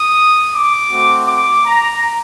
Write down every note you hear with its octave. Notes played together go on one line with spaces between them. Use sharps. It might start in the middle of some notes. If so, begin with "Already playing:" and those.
Already playing: D#6
D6
A3 C4 F#4
D6
A#5